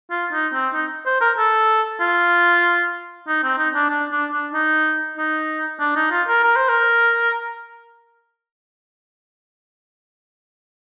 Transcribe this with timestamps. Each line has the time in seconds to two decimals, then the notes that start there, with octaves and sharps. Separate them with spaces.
0.11 F4
0.33 D#4
0.54 C4
0.74 D#4
1.06 C5
1.21 A#4
1.38 A4
2.00 F4
3.28 D#4
3.44 C4
3.58 D#4
3.75 D4
3.90 D4
4.12 D4
4.33 D4
4.53 D#4
5.18 D#4
5.80 D4
5.96 D#4
6.11 F4
6.28 A#4
6.44 A#4
6.56 C5
6.69 A#4